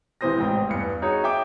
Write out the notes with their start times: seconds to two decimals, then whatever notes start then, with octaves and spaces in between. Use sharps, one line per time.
0.21 G#1 C3 E3 C5 D#6 A#6
0.40 A1 G#2 C4 G5
0.69 E2 G2 C#7
1.02 D#4 F#4 G#4 C#5
1.24 E5 G5 G#5 D6 G6